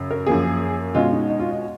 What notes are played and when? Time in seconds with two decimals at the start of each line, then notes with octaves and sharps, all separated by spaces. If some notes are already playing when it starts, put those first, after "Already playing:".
Already playing: F#2 C#3
0.11 A#4
0.27 F#2 F3 A#3 G#4
0.95 B2 G#3 C#4 F4
1.11 D#4
1.29 D#4
1.40 F4
1.51 D#5